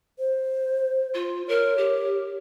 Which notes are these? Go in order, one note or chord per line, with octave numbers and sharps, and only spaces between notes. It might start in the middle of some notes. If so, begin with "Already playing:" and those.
C5
F4
A#4 C#5
G4